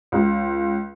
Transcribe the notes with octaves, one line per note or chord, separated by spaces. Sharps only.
C#2